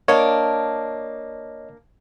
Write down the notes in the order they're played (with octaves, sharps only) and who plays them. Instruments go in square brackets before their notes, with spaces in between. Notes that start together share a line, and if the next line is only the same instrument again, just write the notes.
[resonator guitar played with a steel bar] A#3 D4 [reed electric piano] C#5 D#5